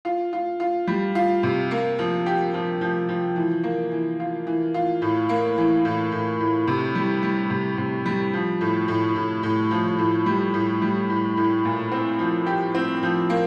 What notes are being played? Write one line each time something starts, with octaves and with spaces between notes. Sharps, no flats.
F4
F4
F4
G3
F4
C3
A#3
F3
G4
F3
F3
F3
E3
A#3
E3
F4
E3
F4
A2
A#3
E3
A2
A2
A2
C3
G3
G3
C3
C3
G3
F3
A2
A2
A2
A2
F3
A2
G3
A2
G3
A2
A2
A#2
C4
F3
G4
C4
F3
A#3